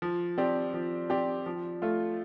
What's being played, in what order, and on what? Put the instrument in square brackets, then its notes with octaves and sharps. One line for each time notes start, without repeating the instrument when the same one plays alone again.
[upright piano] F3
C4 G4 D5
F3
C4 G4 D5
F3
A3 F4